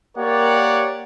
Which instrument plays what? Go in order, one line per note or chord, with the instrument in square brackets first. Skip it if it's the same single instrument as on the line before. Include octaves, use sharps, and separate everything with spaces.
[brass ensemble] A#3 G4 A#4 C#5 D5 F#5